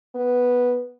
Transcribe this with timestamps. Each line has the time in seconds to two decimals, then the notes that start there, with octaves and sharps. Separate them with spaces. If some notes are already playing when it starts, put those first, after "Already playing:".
0.15 B3